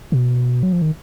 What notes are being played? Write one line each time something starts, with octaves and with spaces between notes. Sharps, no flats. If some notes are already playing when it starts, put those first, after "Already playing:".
B2
F#3
F3
D#3